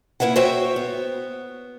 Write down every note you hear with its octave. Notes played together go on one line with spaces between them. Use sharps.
A#3 E4 B4 E5 F#5
F#4 C5 C#5 E5 G5
B3